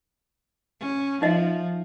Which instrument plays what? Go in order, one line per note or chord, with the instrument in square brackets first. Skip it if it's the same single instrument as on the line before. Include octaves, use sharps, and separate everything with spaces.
[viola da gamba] C#4
[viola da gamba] F3 [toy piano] D#4 D#5 E5